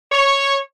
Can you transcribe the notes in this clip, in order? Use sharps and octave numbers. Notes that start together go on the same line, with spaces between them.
C#5